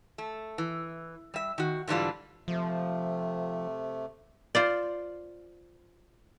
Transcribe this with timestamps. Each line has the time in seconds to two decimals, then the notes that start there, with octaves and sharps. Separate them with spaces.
0.18 A3
0.58 E3
1.34 G3 E5
1.58 D#3 F#4
1.88 G#2 D3 E3 G3 D4 F4
2.48 C3 F3 A3
4.55 F4 C5 D5